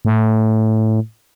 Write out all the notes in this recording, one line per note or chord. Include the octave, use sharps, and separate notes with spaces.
A2